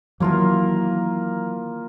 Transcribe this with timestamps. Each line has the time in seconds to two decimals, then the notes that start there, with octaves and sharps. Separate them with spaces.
0.20 D#3 E3 F#3 A#3 F4 A#4